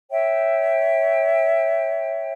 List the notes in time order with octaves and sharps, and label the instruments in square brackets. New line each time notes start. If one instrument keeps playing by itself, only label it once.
[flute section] C#5 E5 G5